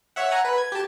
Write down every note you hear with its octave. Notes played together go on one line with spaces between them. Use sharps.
C#5 E5 F#5
F#5 G#5 A#5
B4
G#6
G4 A5